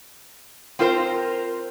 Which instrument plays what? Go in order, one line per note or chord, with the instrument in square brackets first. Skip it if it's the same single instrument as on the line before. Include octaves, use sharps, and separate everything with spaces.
[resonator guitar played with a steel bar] C4 F4 A#4 C5